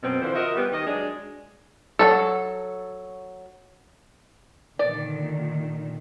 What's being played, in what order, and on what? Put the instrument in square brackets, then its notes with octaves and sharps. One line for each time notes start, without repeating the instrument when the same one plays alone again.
[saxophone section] F#2 B2 C4
D3 E3 F3 C5
F4 F#4 A#4 D#5 E5
G3 B3
D#3 D#5
F#3 G#3 D4
[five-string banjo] F#3 A3 A4
[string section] A#2 D3 D#3 [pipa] D5